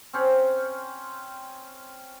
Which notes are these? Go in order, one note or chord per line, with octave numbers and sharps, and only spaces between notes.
C4 C#4 C5